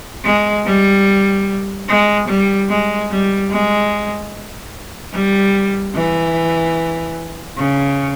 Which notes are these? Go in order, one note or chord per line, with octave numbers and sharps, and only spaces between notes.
G#3
G3
G#3
G3
G#3
G3
G#3
G3
E3
C#3